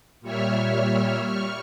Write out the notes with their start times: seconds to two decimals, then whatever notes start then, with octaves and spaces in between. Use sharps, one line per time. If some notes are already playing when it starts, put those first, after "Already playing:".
0.21 A#2 G3 C#5 E5 F6
1.24 G3 C#6 F6